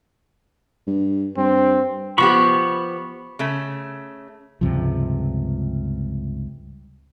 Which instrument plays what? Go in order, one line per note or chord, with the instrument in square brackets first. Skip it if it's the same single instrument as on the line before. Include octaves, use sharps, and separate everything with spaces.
[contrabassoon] G2
[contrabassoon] G2 [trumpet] C4
[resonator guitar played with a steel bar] F3 B3 G4 [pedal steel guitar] B5 C#6
[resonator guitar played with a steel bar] C#3 A3
[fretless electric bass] C#2 G2 C3 F3